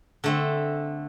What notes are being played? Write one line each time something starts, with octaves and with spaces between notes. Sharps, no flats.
D3 A3 C4